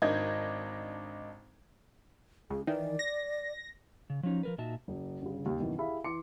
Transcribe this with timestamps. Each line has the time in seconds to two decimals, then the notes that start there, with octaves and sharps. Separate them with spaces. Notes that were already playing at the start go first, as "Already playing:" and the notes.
0.02 G#1 D4 D#4 D#5 G6 G#6
2.50 C#2 G#4
2.67 D#3 E3 D5
2.99 A#6
4.10 C#3
4.23 F3 F#3 C#4 D#4
4.43 F3 A#4 B4
4.58 A#2 D#4 F#4 E5 A5
4.88 F#1
5.22 G1 C#3
5.46 D#2
5.59 F#2 B2 D#3 E3
5.78 E4 G4 G#4 E5 F5 B5
6.04 E3 C6 D6 C#7